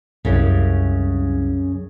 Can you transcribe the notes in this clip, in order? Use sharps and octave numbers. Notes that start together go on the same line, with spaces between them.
C2 F#2 C#3